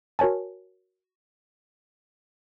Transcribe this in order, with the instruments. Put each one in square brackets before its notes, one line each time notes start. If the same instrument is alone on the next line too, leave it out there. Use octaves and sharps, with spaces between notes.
[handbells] F#4 A#4 C#5 G#5 A5